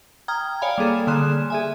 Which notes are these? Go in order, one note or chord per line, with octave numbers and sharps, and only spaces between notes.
G5 A#5 D#6 F6 G#6
C#5 D5 F5 G#5 B5
G3 A#3 G#4 A4
D3 A#3 C6 D#6 F#6 E7
G#4 E5 G#5